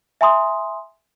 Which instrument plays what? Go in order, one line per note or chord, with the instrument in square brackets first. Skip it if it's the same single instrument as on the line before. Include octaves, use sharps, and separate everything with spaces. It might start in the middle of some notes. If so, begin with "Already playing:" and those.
[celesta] E5 G#5 A#5 C6 D#6